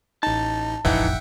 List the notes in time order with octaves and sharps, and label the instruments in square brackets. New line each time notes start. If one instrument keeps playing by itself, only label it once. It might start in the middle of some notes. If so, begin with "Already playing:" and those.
[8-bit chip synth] A1 D#4 [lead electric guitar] A5
[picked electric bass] E1 A1 F2 [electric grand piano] E3 D#4 [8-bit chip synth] E5 F#5 G5